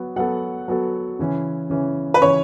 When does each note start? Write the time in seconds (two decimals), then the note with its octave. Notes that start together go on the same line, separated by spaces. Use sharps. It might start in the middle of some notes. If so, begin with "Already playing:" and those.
Already playing: F#3 B3 F#4
0.16 F#3 B3 F#4 A4 F#5
0.68 F#3 B3 F#4 A4
1.19 C#3 E3 C#4
1.70 C#3 E3 C#4
2.14 B4
2.22 C#3 E3 C#4 C#5